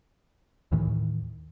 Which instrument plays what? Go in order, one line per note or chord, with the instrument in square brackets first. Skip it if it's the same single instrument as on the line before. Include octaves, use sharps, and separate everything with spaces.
[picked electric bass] D#2 A2 D#3 E3